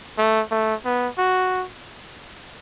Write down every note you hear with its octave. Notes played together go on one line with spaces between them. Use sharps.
A3
A3
B3
F#4